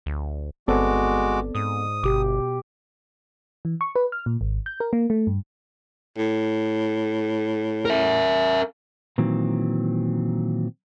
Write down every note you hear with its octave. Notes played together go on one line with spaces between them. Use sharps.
D2
G1 G#3 B3 C4 F#4 A4 D5 D6
G#2 D#6
G1 B2 G4 D6
E3
C#6
B4
F6
A#2
G#1
G6
A#4
A#3
A3
G2
A2
A#4 E5
A#2 D#3 E3 F#3 C4